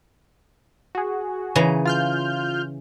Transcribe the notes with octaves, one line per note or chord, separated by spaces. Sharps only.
F#4 G#4
C#3 E3 A#5
F4 F6 G6